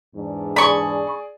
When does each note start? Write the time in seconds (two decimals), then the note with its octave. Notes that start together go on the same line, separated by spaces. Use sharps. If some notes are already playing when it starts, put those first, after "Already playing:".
0.15 E2 G#2 D4
0.56 G#4 D5 B5 C#6